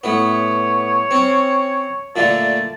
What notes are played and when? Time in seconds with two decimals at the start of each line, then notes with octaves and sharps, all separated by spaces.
0.04 A2 B3 C#5
1.11 C4 C#4
2.16 A#2 D3 A3 A5